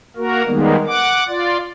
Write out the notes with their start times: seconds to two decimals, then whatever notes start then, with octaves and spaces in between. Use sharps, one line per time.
0.17 A#3 F#4 A#4
0.46 D#3 G3 G#3 A#3 B3
0.87 F#5 D6
1.28 F4 D5